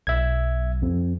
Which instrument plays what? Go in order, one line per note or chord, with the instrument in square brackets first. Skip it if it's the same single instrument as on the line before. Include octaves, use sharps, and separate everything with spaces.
[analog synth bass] B1 [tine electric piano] E5 G#6
[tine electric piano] F2